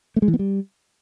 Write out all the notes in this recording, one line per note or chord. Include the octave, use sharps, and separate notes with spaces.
A3
G#3
E3
B3
G3